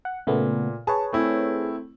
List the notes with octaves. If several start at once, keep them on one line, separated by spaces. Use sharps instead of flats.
F#5
A#2 C#3 A3 B3
G#4 B4 C#5 A5
A3 C4 E4